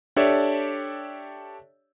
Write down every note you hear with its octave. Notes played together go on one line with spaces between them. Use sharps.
D4 G4 A4 C#5 D5 E5